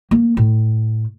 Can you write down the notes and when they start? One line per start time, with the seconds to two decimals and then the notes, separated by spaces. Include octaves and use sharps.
0.11 A#3
0.37 A2